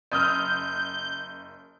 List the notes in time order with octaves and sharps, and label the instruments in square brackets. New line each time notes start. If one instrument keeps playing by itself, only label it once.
[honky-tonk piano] F#1 D#6 F6 [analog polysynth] G6